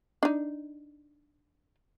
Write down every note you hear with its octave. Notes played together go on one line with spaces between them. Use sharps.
D4 D#4